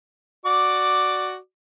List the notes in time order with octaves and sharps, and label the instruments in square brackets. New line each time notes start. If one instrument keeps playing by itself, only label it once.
[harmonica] F#4 D5 D6